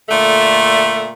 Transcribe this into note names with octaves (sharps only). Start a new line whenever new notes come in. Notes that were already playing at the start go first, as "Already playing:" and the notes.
A#2 D3 A3